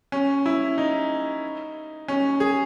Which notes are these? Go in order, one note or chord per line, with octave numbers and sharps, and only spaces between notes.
C#4
E4
D#4
C#4
G#4